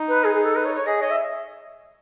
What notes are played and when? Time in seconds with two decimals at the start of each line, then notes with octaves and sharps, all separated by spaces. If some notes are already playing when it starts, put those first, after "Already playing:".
Already playing: D#4
0.08 B4
0.24 G#4
0.34 G#4
0.44 A4
0.55 B4
0.65 C#5
0.75 C#5
0.86 G#4 D#5
1.01 C#5 D#5
1.10 E5